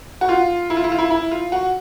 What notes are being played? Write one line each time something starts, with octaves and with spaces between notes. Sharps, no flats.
F#4
F4
E4
F4
E4
F4
E4
E4
F4
F#4